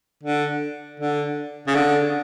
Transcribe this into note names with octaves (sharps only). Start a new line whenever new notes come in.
D3
D3
C#3
D3